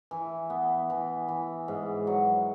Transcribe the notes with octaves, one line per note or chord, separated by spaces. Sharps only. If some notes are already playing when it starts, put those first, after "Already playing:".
E3
B3
E3
E3
G#2
F#3